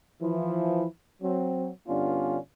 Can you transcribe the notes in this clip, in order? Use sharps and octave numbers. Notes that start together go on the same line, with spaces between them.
E3 F3 E4
F#3 C4
G2 D3 B3 C#4 D4 F4